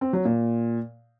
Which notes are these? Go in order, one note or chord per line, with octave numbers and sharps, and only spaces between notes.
C4
F#3
A#2